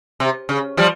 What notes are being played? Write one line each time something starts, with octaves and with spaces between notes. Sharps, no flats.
C3
C#3
F3 G3